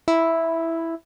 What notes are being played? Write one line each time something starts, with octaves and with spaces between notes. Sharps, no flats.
E4